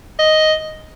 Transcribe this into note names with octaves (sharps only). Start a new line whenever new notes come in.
D#5